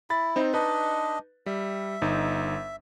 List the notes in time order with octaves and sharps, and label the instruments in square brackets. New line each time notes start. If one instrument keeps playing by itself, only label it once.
[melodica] E4 [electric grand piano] B5 A6
[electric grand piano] C4 D#4 C5
[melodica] D4 D#5 [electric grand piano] D#4 B4
[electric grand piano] G3 [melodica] E5
[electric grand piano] G1 D#4